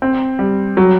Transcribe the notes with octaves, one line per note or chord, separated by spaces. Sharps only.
C4
G3
F#3